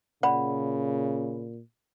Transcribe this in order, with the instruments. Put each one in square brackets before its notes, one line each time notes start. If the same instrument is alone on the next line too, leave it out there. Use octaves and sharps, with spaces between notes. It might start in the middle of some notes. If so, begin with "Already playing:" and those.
[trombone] A#2 [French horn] C#3 [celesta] D5 B5 [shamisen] F#5